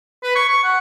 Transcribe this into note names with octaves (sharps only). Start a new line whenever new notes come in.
B4
C#6
C#6
F#5